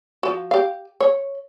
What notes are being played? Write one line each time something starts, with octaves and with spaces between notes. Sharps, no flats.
F3 F#4
G4 F5
C#5